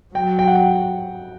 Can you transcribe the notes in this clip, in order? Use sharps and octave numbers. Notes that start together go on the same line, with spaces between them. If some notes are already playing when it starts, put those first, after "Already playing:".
F#3 G5
G5
F#5
G5